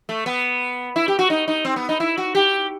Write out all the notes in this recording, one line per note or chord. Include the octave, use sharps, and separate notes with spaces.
A3
B3
E4
G4
F#4
D#4
D#4
C4
B3
D#4
E4
F#4
G4